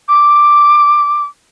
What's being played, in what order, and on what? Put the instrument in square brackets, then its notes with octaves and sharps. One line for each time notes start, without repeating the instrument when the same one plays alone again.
[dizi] D6